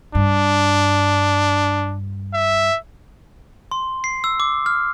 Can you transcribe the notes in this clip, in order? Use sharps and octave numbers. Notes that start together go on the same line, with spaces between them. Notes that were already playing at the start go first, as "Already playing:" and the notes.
G2 D4
E5
C6
C7
E6
D6
F6